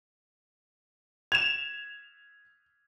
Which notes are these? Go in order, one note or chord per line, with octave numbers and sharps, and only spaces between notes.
G#6 E7 F7